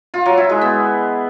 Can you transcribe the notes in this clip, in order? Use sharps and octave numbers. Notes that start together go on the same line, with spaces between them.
F4
F#3
E4
G#3
B3